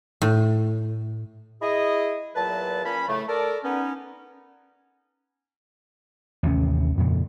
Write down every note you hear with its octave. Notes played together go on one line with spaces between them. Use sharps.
A2
E4 G#4 D#5
E2 A#2 F#3 B4 A5
A#2 C#4 B5
A2 C#3 A3
A4 A#4 D5
B3 C#4 D#4
A1 D#2 C3 C#4
F2 A#2 C#3